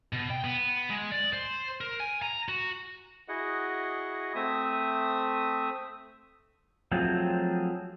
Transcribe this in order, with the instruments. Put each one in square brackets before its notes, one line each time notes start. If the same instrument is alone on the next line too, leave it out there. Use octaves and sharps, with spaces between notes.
[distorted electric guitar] B2
G5
B3
G#3
D5
C5
A#4
G#5
A#5
F#4
[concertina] E4 F#4 G#4 D#5 F#5
A3 C4 E5 D#6
[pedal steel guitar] F3 F#3 A3 C4 G#4